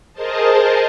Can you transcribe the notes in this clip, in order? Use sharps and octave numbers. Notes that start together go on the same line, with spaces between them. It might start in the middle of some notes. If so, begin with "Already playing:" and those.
G#4 A#4 C5 D#5 A5